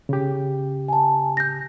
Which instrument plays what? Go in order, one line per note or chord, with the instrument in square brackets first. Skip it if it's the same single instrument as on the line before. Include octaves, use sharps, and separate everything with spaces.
[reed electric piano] C#3 G4
[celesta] G#5 A5
G6 A#6